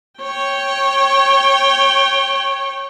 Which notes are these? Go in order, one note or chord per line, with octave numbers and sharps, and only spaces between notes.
C#5 G5